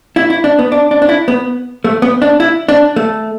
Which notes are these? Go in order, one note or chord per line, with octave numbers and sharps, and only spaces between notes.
E4
E4
D4
B3
D4
D4
D4
E4
B3
A3
B3
D4
E4
D4
A3